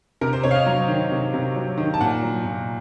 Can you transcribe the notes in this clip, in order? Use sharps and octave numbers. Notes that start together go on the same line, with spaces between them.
C3 A#4
C5
C3 C#5
F5
D#5
F#3
D#3
C3
C3
F#3
D#3
A5
A#2 F#5
F#3
A#2